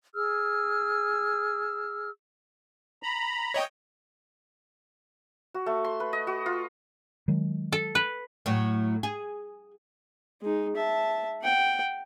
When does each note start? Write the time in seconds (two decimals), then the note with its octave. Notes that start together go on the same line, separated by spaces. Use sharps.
0.14 G#4 E6 F6
3.03 A#5 B5
3.54 C#5 D#5 G5
5.54 F#4
5.66 A3
5.85 C6
6.00 B4
6.13 D#5
6.27 F#4
6.46 F4
7.28 D#3 F#3 G#3
7.72 A4
7.95 B4
8.46 A2 F#3
9.03 G#4
10.42 G#3 D#4
10.76 E5 A5
11.43 F#5 G5